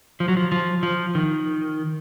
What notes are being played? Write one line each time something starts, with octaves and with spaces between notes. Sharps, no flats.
F3
F#3
F3
F3
F3
D#3